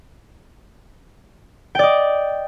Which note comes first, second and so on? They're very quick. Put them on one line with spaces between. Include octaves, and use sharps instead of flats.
G5 D5 D#5